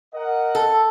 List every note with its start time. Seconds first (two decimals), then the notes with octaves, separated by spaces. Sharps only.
0.14 A#4 D#5 F#5
0.55 A4